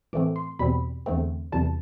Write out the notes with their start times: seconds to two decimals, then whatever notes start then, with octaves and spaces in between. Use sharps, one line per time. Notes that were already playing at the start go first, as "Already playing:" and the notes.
0.13 A2 E3 A3 C4 D6
0.36 C6
0.59 E2 B2 G3 C4 B5
1.06 E2 D3 A3 C4
1.52 E2 C3 E3 G3 A5